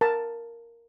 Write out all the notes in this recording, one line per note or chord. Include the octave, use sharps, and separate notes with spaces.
A#4 A5